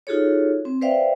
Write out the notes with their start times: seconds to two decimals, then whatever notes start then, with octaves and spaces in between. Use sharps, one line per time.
0.07 D#4 F4 F#4 G#4 A4 C#5
0.65 C4
0.81 B4 C5 D5 E5 F5 G5